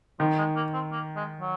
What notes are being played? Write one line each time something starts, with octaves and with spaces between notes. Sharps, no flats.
D#3 F3
G#3
A#3
C4
A#3
G#3
F#3